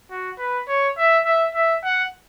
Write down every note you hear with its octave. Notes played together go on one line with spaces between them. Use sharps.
F#4
B4
C#5
E5
E5
E5
F#5